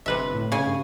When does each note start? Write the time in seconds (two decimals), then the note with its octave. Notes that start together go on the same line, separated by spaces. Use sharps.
0.06 G1 C3 B4 E5
0.34 A2
0.52 C#3 G#5
0.66 G2